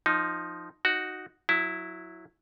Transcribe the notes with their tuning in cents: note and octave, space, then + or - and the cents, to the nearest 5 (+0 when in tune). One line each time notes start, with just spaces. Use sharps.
F3 +0 D#4 +0
D#4 +0 F#4 +0
F#3 -10 E4 +0